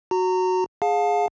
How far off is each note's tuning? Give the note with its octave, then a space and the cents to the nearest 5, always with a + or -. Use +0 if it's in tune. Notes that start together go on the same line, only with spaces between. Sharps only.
F#4 +0 A#5 -25
G#4 +0 F5 +30 A5 +0